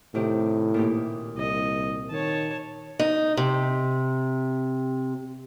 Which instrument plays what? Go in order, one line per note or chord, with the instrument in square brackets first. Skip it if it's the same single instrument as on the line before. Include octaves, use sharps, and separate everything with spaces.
[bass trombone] A2 [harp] C3 D#3 G4
[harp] A#2 D#4 G4
[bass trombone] C2 [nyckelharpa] D#5
[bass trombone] D#3 [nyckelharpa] C#5 A5
[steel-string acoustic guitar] D#4
C3